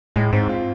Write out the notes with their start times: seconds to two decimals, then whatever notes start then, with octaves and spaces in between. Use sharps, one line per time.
0.16 A2 G#3
0.33 G#2 C4
0.49 F4